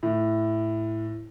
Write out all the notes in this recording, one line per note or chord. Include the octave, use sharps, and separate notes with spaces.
A2